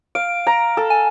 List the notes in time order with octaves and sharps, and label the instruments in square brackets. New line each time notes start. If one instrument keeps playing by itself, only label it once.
[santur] F5 [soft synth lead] D7
[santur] A#5
A4
[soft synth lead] G#5